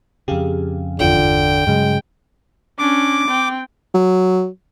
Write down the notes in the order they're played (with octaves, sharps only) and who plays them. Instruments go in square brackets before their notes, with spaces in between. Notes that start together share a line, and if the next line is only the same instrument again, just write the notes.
[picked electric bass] F2 C#3 [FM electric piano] G4 G#4 F5
[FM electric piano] G1 E2 F4 [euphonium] D3 [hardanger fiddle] G5
[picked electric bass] G2 C#3 F#3 [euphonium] G#3
[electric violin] C#4 D4 [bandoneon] D6
[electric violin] C4 G5
[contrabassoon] F#3